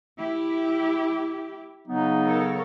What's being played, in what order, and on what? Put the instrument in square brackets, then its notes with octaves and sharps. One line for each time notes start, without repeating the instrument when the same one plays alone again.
[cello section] E4 G4
[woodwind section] C#3 F#3 B3 [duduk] D#4
[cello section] A4 A#4 C#5